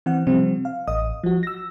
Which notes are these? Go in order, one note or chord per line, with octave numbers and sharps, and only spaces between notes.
E3 C4 F#5
C3 F3 G3 C4
F5
A1 D#5 D#6
F3 F#4
E6 A#6